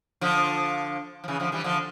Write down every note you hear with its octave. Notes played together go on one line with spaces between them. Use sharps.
D3 F3
F3
C#3 E3
D3 F3
E3 G3
D3 F3